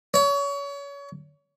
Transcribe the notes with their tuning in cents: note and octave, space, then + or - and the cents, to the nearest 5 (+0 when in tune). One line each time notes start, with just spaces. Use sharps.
C#5 +30